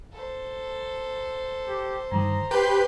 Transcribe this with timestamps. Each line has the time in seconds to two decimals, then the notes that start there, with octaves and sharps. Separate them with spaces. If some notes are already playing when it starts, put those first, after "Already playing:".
0.12 A4 C5
1.68 G4
2.12 G2 D3 D#3 A#5
2.51 G4 B4 C5 A5 C6 G6